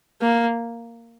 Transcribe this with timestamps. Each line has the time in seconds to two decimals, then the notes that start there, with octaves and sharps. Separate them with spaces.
0.21 A#3